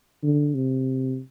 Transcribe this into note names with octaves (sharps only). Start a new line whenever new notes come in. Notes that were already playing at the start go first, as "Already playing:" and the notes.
D3
C3